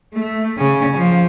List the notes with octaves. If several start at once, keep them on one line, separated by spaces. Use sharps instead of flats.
A3
C#3 C#4
F3